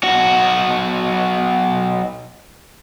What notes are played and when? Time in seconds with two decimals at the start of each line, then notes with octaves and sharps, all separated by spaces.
0.04 B1 F#4